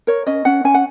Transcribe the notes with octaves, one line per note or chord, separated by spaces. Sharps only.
A#4 C#5
C#4 D#5
C#4 F#5
C#4 G#5
F#5